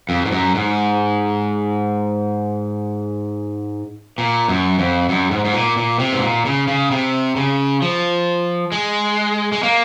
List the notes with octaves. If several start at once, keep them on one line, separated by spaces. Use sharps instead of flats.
F2
G#2
F#2
G#2
A#2
F#2
F2
F#2
G#2
G#2
A#2
A#2
C3
G#2
A#2
C#3
C#3
C3
C#3
F3
G#3
G#3
A#3